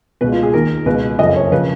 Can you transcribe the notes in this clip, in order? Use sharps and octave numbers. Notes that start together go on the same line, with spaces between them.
C#2 B2 B4
F4
G#4
D#2 D#3 A#4
C#2 B2 B4
F#1 F2 C#3 F3 D#5
C#5
C#3 F3 B4